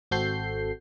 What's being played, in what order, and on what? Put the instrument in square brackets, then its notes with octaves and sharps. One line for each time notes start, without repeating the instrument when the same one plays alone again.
[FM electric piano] G#1 C4 F#4 A4 G6 C7